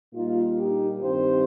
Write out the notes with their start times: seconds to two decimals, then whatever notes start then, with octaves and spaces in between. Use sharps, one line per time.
0.14 A#2 G3 A#3 D#4 F4
0.59 D#4 G4
1.03 G2 D#3 C4 D#4 G4 C5